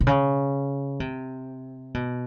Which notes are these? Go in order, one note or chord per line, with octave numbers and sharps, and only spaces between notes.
C3
C#3
C3
B2